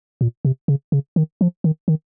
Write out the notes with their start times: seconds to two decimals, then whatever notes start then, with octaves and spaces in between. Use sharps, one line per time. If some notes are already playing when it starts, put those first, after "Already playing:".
0.21 A#2
0.45 C3
0.68 C#3
0.92 C#3
1.16 D#3
1.41 F3
1.64 D#3
1.88 D#3